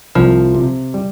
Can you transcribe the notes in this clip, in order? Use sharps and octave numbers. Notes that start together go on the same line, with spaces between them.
C2 F3
C3
G3